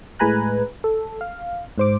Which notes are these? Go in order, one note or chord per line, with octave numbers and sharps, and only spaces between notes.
A2 G#3 B4 G#5 A#5 F#6
A4
F5
G#2 C5 D6